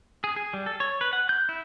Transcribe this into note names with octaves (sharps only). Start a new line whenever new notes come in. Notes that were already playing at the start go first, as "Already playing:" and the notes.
G#4
G#4
G3
A4
C#5
B4
F#5
G6
E4